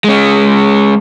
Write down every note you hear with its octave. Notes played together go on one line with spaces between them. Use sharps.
G#3 C#4